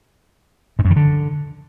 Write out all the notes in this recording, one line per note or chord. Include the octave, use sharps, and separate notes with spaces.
G#2
F#2
D#3
D3